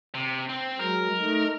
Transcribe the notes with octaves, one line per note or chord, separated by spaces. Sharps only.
C3
C4
F#3 G#3 A#4
A3 D#4